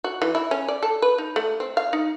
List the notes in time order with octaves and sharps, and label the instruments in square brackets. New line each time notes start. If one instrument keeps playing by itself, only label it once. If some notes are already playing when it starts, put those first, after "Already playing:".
[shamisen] F#4
E3
E4
C#4
D5
A4
B4
D#4
A3
C4
F5
D#4